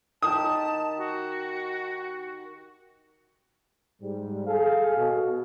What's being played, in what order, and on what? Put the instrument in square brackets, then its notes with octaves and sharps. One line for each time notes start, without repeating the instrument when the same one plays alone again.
[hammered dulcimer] D#3 G4 [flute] A5 [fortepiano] D#6
[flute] F#4
[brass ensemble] G#2 G3
G#4 A4 F5
B2